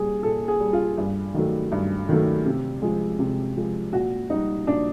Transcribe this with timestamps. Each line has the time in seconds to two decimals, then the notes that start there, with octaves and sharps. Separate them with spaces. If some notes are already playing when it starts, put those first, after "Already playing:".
Already playing: A#2 G3 G#4
0.23 A#2 A4
0.48 G#4
0.60 G3
0.73 F4
0.98 G2
1.34 D#3 F#3 A3
1.72 G2
2.09 D#3 F#3 A3
2.46 C3
2.82 F3 G#3
3.19 C3
3.56 F3 G#3
3.93 A#2 F#4
4.30 G3 D#4
4.67 A#2 D4